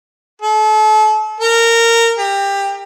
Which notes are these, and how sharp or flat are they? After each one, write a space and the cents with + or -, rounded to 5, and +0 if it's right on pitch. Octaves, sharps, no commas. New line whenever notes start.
A4 -35
A#4 -15
G4 +20